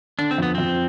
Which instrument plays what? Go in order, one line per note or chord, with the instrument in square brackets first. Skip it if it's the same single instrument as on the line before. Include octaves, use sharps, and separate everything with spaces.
[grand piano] D3 [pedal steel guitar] D4
[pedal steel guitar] C4
[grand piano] F2 [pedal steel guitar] B3
[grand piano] F2 [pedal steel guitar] C4